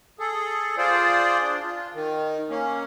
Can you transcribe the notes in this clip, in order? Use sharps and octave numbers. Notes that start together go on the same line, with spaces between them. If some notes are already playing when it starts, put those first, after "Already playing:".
G#4 A4
F4 G#4 C5 D5
D4
F4
D#3
A#3 C#4